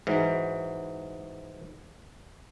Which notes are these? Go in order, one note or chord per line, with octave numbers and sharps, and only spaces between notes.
G#2 E3 F#3